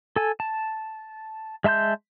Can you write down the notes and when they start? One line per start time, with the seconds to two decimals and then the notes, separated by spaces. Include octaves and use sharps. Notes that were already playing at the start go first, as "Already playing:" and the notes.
0.16 A4 G#5
0.40 A5
1.64 G#3 E5 A5 C6 G6